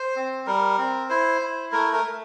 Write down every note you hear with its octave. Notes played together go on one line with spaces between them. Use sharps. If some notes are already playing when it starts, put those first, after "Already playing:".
Already playing: C5
C4
G3 A#4
C4
E4 C5
E4
A3 A#4
A#4
A3